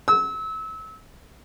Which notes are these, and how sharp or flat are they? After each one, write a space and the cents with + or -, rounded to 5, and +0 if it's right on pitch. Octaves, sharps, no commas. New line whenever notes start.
E6 -30